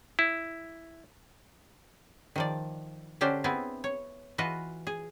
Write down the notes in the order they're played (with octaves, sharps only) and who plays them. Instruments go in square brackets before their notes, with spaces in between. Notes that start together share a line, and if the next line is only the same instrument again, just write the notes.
[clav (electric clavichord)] E4
[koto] D#3 F3 D5
D3 C#4 D4 G4 C5
B3 C4 E4 G#4
C#5
E3 F4 F#4 B4 D#5
G#4